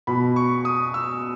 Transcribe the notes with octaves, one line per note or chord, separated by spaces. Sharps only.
B2 B5
C#6
D#6
E6